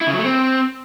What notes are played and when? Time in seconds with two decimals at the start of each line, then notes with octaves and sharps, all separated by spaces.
0.01 E4
0.07 C#3
0.13 F#3
0.19 A3
0.25 C4